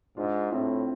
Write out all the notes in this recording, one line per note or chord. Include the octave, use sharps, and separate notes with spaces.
G#2 D4 F4
A2 C4 E4